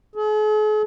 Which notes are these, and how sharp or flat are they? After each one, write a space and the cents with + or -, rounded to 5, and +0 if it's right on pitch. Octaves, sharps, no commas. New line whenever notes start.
G#4 +45